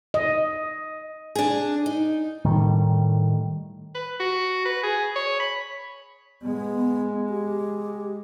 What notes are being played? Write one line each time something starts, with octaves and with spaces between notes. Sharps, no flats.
D#5
D4 G#4
D#4
A2 D#3 G3
B4
F#4
B4
G#4
C#5
B5
G#3 B3
G4